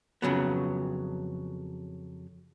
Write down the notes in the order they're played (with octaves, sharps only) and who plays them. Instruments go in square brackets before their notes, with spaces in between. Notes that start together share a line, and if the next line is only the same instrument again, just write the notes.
[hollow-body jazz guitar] F2 C#3 F#3 B3